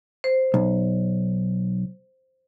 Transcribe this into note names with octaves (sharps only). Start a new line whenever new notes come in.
C5
B1